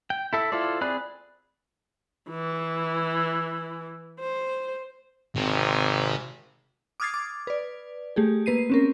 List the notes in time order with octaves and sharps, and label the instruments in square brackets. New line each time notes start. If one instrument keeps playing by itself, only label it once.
[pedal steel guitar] G5
E4 A4 E5
E4 F4 A4 C5 D5
C4 G#4 D5 B5 F#6
[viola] E3
C5
[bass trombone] G#1 [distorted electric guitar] C3
[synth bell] D6 D#6 F6 G#6 A6 C7
D6
B4 D5
A3 G4 G#4
A#3 B4 C7 D#7
C4 C#4 A#4